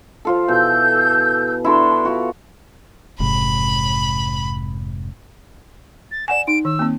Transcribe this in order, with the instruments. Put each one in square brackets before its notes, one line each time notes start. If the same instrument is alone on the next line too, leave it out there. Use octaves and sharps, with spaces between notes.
[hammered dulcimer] F3 F4 A4
[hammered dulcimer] B2 E3 [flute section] A4 E6 G6
[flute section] D4 C6 [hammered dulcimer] E4 F#4 A4
[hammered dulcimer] F4 F#4
[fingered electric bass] F1 G#2 C3 [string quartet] B5
[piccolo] A6
[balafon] D5 F#5 G#5 [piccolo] E7
[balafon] D#4 [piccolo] D7
[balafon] D#3 [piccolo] E6
[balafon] A#3 C4